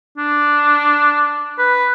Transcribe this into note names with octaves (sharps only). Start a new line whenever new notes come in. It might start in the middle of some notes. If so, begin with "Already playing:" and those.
D4
B4